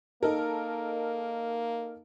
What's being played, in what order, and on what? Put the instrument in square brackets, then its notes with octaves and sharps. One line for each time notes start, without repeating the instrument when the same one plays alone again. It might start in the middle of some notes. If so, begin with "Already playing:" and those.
[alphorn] A#3 [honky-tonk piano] D#4 A4 A#4